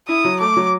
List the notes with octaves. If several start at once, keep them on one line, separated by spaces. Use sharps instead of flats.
E4 D#6
F#3
A3 D6
F#3